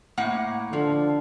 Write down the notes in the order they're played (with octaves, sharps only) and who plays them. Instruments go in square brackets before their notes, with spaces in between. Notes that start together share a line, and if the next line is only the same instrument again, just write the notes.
[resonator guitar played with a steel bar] A2 A#3 F#5
[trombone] D3 [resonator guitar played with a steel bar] F3